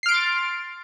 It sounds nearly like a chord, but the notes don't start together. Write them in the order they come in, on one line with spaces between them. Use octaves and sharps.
C7 F6 D7 C6 A6